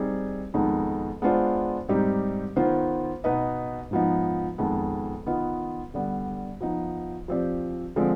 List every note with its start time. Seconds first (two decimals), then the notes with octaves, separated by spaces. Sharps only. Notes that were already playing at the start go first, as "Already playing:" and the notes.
Already playing: G3 C4 D#4 G#4
0.54 F2 D#3 G#3 B3 D#4
1.22 G#3 B3 D4 F4 C5
1.89 G#2 G3 C4 D#4 G4
2.56 D#3 B3 F4 C5
3.24 B2 B3 D#4 B4 D#5
3.91 G#2 F3 B3 D#4
4.58 F2 D#3 G#3 B3
5.26 D#3 B3 F4 B4 D#5
5.94 D3 G3 B3
6.61 F3 B3 D#4
7.28 F3 C4 G4 D5
7.96 D3 F3 G#3 C4